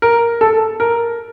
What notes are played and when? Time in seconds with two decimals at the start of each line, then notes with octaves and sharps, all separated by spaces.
0.02 A#4
0.41 A4
0.80 A#4